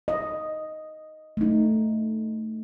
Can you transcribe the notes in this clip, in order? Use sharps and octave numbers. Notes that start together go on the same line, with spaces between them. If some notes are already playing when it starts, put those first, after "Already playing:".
D#5
A3 D#4